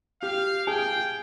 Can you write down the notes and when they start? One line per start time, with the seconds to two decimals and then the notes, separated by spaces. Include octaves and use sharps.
0.22 G4 F5
0.67 G#4 G5